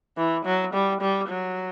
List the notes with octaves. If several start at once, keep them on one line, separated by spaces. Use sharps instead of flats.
E3
F#3
G3
G3
F#3